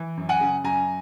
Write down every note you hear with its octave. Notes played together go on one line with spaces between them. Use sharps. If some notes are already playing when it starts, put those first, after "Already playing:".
Already playing: E3
F#2
F#5 G#5
C#3
F#2 G#5 A#5